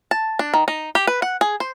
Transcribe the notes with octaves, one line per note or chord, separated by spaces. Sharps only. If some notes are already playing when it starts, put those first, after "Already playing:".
A5
D4
D#3
D#4
G4
B4
F#5
G#4
C5